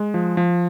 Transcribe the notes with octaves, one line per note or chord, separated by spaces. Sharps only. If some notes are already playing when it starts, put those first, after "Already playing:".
Already playing: G#3
F3
F3